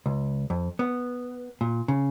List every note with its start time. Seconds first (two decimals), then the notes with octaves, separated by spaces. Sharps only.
0.06 C#2
0.50 F2
0.79 B3
1.61 A#2
1.88 C#3